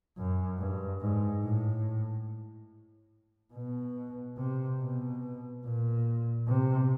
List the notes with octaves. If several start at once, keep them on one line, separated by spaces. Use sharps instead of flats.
F#2
G2
G#2
A2
B2
C3
B2
A#2
C3